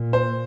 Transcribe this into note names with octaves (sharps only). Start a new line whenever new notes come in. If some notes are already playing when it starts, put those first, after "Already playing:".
Already playing: A#2
C5